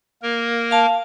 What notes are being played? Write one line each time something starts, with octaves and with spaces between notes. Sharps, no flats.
A#3 A#4
F5 A5